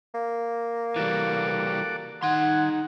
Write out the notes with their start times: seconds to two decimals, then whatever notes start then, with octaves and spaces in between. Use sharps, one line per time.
0.14 A#3
0.96 E3 G3 F#4 A4 D6
2.23 D#3 D#4 F#5 G#5 C6